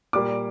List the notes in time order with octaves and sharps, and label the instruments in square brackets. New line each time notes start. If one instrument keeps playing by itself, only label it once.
[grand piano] A#2 G3 A#3 D6